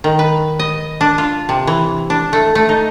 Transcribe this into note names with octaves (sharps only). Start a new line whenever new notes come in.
D#3
B4
D#5
D4
F4
C3
E3
D4
A3
A3
D#4